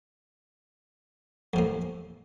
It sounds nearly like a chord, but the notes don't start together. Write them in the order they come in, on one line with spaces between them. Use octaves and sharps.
F2 C3 A2